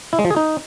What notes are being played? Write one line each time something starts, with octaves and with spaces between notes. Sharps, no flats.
E4
G#3
F3
G#4
D#4